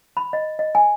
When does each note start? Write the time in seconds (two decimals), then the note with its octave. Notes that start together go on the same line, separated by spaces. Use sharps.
0.17 B5
0.33 D#5
0.59 D#5
0.75 G#5